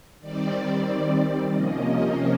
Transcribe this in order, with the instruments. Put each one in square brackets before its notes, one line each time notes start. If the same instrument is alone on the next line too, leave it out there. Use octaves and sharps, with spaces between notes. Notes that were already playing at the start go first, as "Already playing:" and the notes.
[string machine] D#3 G3 C4 D5
C3 F3 A#3 C#4 D#5